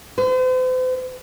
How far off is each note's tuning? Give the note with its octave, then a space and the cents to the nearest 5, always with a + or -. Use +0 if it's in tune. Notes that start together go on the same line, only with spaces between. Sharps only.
C5 -45